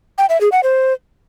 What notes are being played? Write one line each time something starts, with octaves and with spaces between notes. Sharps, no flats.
G5
E5
G#4
F#5
C5